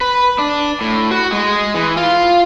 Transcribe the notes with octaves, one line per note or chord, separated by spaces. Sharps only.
B4
D4
A2
F#4
G#3
E3
F4